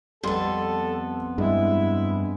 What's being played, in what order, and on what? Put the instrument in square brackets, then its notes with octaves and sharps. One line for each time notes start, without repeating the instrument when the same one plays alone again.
[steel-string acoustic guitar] F2 B3 [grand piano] G3 C6 [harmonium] A4
[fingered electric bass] G2 [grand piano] G#3 [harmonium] E4